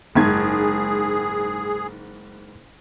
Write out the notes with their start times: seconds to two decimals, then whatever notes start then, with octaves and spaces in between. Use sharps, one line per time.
0.15 F#1 G#2 G#4 G#6